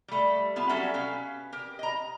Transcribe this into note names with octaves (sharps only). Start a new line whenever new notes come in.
G3 A3
B3 F4 E5 A5
F#3 G3 C#4 F#4 A4 E5
B2 C#4 F5
G4 A#4
D#5 A#5